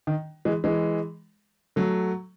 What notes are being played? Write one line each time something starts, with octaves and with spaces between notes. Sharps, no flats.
D#3
E3 G#3
E3 G#3
F#3 A3